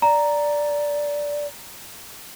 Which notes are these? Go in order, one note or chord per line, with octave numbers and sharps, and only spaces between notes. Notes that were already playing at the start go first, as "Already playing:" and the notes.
D5 A#5